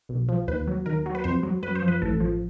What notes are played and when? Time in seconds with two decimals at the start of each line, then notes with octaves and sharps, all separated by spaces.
0.09 B1
0.29 F3
0.48 D#2 B4
0.68 F#3
0.86 D#2 A#4
1.06 F#3
1.15 B4
1.24 F2 C5
1.43 F#3
1.63 F#2 B4
1.75 C5
1.82 F3
1.88 B4
2.02 A1 A4
2.20 F3